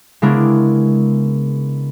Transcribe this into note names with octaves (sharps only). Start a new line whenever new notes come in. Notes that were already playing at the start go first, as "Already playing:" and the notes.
C#3 G#3 B3 D4 E4 A#4